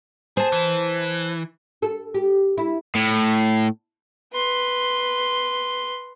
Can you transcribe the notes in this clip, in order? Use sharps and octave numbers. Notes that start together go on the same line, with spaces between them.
G#4 C5 A5
E3
A4
G4
E4
A2
B4 C6